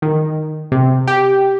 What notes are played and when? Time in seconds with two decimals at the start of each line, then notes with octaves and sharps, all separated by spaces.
0.02 D#3
0.72 C3
1.07 G4